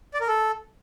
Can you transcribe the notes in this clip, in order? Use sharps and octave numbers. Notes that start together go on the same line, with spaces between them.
D5
A#4
A4